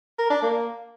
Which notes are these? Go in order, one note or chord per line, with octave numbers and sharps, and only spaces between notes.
A#4
D4
A#3